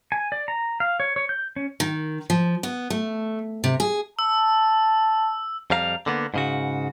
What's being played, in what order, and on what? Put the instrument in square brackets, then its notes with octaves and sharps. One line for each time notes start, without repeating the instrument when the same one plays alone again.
[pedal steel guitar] G#5
D5
A#5
F5
C#5
C#5
G6
C#4
[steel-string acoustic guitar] D#3
F3
B3
A3
C3
G#4
[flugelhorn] A5 [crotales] E6
[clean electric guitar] F2 G3 F5 A#5
D3 A#3 B3
G#2 C#3 F#4